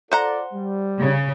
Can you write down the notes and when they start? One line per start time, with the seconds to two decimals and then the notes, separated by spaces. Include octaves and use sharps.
0.12 F4 A4 C5 D5 F#5 A#5
0.53 G3
1.01 C#3